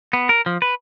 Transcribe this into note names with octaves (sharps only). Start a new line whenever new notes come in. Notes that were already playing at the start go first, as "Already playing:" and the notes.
B3
A#4
F3
B4